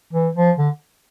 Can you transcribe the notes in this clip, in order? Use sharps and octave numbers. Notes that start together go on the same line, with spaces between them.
E3
F3
D3